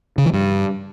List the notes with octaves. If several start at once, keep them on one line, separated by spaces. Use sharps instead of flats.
C#3
E3
G2